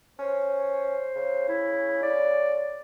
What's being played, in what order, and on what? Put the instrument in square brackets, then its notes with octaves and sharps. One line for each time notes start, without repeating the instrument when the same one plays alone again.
[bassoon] C#4 [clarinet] C5
[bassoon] C#3
[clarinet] E4
D5